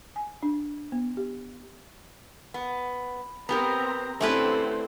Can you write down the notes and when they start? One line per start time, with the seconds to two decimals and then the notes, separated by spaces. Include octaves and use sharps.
0.16 G#5
0.43 D4
0.92 B3
1.17 G4
2.54 B3
3.49 B3 C4 G4 A#4 A#5
4.21 D3 A3 C4 C#4 E4 G4 B4 C5